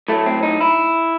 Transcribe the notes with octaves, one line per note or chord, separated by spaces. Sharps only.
A2 F#3 A3
C4
D#4
E4